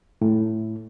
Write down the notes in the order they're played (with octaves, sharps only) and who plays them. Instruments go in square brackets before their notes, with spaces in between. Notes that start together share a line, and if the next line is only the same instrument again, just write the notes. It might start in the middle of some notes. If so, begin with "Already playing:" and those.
[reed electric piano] A2